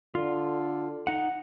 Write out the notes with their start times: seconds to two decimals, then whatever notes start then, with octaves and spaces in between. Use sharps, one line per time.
0.15 D3 F4
1.07 D#4 F#5